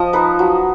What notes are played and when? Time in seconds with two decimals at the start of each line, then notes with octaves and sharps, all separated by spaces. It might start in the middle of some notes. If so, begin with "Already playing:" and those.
Already playing: F3 D#5
0.13 D#4 B4
0.39 F#3